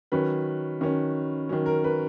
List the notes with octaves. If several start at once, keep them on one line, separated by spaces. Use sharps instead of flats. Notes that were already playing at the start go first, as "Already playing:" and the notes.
D#3 F#3 C#4 B4
D#3 F#3 C#4
D#3 F#3 C#4
A#4
B4